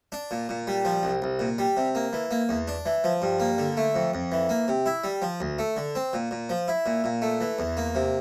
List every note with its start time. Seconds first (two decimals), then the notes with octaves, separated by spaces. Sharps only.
0.12 D4
0.31 A#2
0.49 A#2
0.67 G3
0.85 F3
1.03 C2
1.22 C2
1.39 A#2
1.59 G3
1.77 C3
1.95 A#3
2.13 E3
2.31 A#3
2.49 E2
2.68 D4
2.86 E3
3.04 F3
3.22 G2
3.40 A#3
3.58 D3
3.77 A3
3.95 F2
4.14 F2
4.32 E3
4.49 A#3
4.68 C3
4.86 E4
5.04 G3
5.22 F3
5.40 D2
5.59 A3
5.77 D3
5.95 C4
6.13 A#2
6.31 A#2
6.49 F3
6.68 E4
6.86 A#2
7.04 A#2
7.22 A3
7.41 E3
7.59 E2
7.77 A#3
7.95 C3